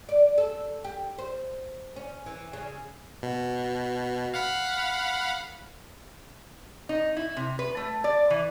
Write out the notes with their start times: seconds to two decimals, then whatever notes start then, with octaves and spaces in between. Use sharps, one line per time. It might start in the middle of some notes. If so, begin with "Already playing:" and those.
0.09 D5
0.38 A4
0.84 G4
1.19 C5
1.96 C#4
2.26 E3
2.53 C#3
3.23 B2
4.34 F5 F#5 B5
6.89 D#4
7.17 E4
7.37 C3
7.59 B4
7.77 A3
8.04 D5
8.30 E3